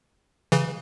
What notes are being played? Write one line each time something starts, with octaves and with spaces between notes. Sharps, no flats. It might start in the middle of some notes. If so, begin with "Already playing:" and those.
C#3 E3